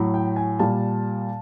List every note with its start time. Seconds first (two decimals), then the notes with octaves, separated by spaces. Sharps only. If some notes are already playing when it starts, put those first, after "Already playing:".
Already playing: A2 F#3
0.14 G5
0.36 G#5
0.59 A#2 G3 A5